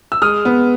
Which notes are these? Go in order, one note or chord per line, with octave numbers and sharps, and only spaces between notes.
E6
G#3 D#6 F6
B3